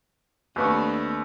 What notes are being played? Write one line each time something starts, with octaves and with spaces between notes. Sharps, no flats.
D#2 A3 B3 C4 D4 C#6